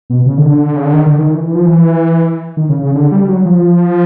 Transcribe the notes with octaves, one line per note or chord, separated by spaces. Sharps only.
B2
C#3
D#3
D3
C#3
D3
D#3
D3
D#3
E3
E3
F3
E3
D#3
C#3
C#3
D3
G3
F#3
F3